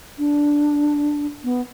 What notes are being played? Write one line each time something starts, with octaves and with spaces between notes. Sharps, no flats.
D4
B3